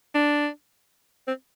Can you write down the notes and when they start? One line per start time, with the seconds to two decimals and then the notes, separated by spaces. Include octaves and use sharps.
0.14 D4
1.28 C4